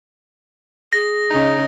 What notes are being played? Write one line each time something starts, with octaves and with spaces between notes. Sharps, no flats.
G#4 A#6
C#3 C#4 D#4 D#5